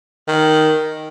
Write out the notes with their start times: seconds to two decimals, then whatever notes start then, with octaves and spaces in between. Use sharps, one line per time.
0.28 D#3